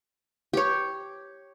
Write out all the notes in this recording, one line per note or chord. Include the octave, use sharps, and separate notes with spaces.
G4 C#5